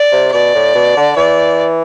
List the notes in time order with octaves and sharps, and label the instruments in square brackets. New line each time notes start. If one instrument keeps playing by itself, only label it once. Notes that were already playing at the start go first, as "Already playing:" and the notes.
Already playing: [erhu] D5
[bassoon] C3
[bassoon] B2 [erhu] D5
[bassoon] A2
B2
D3
[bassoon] E3 [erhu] D5